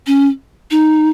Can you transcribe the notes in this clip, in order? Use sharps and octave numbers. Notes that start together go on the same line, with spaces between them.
C#4
D#4